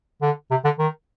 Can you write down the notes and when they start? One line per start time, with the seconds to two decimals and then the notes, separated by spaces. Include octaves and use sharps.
0.22 D3
0.51 C3
0.64 D3
0.79 D#3